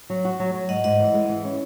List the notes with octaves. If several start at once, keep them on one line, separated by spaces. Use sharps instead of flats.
F#3
F#4
F#3
F#3
G#2 D#5 F#5
G#2 D#5 F#5
E3
G#3
E3
C#4